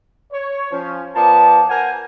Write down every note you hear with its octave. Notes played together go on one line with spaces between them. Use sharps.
C#5
F3 C#4
F3 B3 A#4 B4 D5 A5
A#4 C5 F#5 G#5